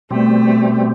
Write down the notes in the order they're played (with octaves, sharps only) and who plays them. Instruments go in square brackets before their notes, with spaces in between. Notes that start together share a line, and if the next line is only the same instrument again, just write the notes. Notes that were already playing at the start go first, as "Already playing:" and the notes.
[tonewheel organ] B2 G3 C4 [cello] A3